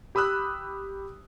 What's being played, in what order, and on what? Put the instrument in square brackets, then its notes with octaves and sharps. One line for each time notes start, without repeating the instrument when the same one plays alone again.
[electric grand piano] G4 B5 D#6 E6 F#6